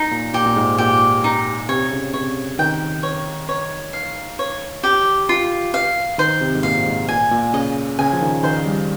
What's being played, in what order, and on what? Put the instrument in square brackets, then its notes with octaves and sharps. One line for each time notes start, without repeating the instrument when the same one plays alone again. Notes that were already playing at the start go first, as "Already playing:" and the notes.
Already playing: [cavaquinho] D#4
[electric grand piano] A#2
[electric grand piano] A#2 [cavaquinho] G4
[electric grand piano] A#2
G#2
[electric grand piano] A#2 [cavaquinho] G4
[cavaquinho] D#4
[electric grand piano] C3 [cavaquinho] C#5
[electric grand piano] C#3
[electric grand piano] C3 [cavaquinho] C#5
[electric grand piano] D#3 [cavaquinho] G5
[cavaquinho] C#5
C#5
F5
C#5
G4
F4
F5
[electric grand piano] D#3 [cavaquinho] C5
[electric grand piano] C3
G#2
[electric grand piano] A#2 [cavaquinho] F5
[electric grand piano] G#2
[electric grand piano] A#2 [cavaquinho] G#5
[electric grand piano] A#2
[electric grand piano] C#3 [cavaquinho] D#5
[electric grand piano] C#3 [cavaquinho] G#5
[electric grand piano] F3
D#3
[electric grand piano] D#3 [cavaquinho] C5
[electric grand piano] G3